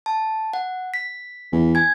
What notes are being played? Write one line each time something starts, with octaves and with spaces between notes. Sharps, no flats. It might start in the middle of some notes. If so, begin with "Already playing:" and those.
A5
F#5
B6
E2
G#5 G#6